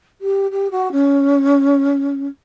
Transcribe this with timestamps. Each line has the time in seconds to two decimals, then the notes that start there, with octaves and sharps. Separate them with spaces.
0.21 G4
0.51 G4
0.70 F#4
0.91 C#4